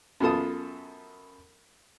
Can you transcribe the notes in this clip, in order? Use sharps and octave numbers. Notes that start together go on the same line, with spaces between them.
F#2 B3 F4 A4 A5 D#6